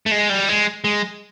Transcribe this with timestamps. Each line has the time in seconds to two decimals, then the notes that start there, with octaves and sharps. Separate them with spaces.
0.06 A3
0.11 G#3
0.29 G3
0.49 G#3
0.84 G#3